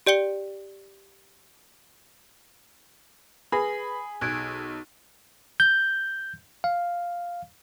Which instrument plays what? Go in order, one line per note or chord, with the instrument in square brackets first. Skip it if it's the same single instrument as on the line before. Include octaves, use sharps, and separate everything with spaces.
[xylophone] G4 D5 G5 C#7 G7
[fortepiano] G#4 [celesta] B4 A#6 [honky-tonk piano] B5
[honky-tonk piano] B1 [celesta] F#6 G#6 D7
[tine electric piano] G6
F5